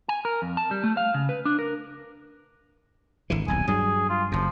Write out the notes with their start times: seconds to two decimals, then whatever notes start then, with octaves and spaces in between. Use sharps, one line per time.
0.08 G#5
0.25 A#4
0.42 F2
0.57 A5
0.71 G3
0.84 A3
0.97 F5
1.14 C#3
1.29 B4
1.45 D4
1.59 A#4
3.30 G#1 D3 E3
3.48 D#1 B1 G#5
3.68 G2 F#3 G#4
4.09 F4
4.32 F#1 F#2 F3